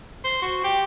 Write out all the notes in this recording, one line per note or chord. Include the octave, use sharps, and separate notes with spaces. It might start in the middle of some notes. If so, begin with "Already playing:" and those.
C5
F#4
G4